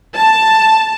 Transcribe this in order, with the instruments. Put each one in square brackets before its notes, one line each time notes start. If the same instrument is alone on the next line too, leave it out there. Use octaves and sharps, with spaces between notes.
[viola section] A5